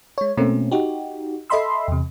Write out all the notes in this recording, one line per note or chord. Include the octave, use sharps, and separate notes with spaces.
G#3 C#5
B2 A3 A#3 C4 C#4
D#4 F#4 G4
A4 D#5 E5 B5 C6 E6
E2 C3